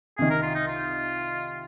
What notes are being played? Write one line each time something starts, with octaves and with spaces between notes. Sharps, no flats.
C2 C3 D#3 G#4
A#4
F4
D#4
F4